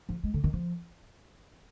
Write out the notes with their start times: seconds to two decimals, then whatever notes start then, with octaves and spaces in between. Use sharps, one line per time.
0.09 F3
0.24 G#3
0.34 D3
0.44 D#3
0.53 F3